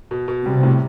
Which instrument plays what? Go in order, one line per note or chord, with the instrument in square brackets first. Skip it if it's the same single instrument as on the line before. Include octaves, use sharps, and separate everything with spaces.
[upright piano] B2
B2
[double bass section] C3 [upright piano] G3
[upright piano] A2